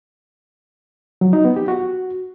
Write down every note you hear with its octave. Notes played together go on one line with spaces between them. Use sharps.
F#3
D#4
B3
G4
F#4